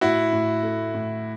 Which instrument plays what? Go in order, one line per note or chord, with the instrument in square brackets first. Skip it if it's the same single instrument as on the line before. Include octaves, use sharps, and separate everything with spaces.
[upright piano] A2 [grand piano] E4 F#4
[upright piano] A2
A3
A2